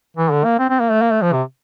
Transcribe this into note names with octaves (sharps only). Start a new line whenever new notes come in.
E3
D3
A#3
C4
C4
A#3
A3
A#3
A3
F3
C3